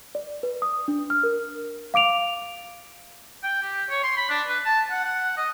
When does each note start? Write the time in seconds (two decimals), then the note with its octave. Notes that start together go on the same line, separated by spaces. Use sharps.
0.15 D5
0.43 B4
0.62 D#6
0.88 D4
1.10 F6
1.23 A#4
1.94 F5 D6 D7 F7
3.43 G5
3.63 G4
3.90 C#5
4.03 C6
4.17 B5
4.29 D4
4.47 B4
4.65 A5
4.91 F#5
5.04 F#5
5.37 D#5